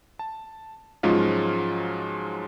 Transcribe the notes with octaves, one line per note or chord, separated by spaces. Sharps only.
A5
G#2 F3 F#3 G#3 C#4 F4